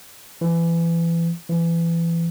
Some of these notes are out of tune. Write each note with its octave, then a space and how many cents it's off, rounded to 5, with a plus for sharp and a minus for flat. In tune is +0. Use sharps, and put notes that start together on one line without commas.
E3 +25
E3 +25